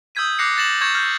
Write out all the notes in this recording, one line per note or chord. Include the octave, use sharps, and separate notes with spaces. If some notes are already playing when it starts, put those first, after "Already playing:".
D#6 E6 G6 G#6 B6 D#7
D6 F#6 A#6 C7 C#7
A6 A#6 E7 F#7
C#6 G6 G#6 A#6 C#7 E7
F6 G6